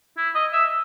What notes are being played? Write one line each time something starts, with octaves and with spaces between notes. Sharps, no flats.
E4
D#5
E5